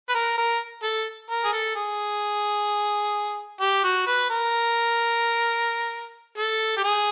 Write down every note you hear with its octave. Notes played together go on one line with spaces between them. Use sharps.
B4
A#4
A#4
A4
A#4
G#4
A4
G#4
G4
F#4
B4
A#4
A4
G4
G#4